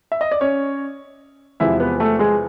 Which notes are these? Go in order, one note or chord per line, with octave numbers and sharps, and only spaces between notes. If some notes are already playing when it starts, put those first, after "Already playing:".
E5
D#5
D5
C#4 C#5
E2 C3 F3 G#3 B3 E4 E5
B3 B4
A3 A4
G#3 G#4